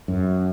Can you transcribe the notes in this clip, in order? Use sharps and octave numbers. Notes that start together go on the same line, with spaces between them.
F#2